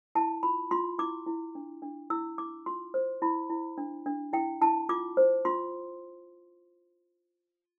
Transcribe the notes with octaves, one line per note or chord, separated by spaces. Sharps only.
E4 A5
F4 B5
F4 C6
E4 D6
E4
D4
D4
E4 E6
E4 D6
F4 C6
C5
E4 B5
E4
D4
D4
E4 G5
E4 A5
F4 D6
C5
F4 C6